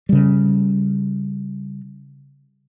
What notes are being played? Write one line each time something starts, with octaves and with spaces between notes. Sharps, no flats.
C#3 G3